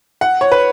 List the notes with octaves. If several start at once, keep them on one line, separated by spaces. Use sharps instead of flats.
F#5
C#5
B4